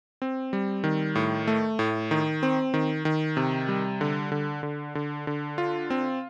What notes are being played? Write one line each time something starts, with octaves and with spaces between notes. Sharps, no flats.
C4
G3
D#3
A2
A3
A2
D#3
C4
D#3
D#3
C3
G3
D3
D3
D3
D3
D3
F4
C4